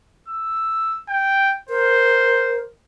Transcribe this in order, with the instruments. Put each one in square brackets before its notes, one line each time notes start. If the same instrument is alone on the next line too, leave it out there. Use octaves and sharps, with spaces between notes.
[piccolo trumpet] E6
G5
[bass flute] A#4 [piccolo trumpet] C5